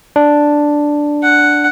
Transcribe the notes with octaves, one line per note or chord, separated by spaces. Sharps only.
D4
F#5